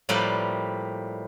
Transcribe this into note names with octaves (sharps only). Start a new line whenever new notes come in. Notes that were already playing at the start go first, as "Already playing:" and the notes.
A2 F3 G3 A#3 B4 D5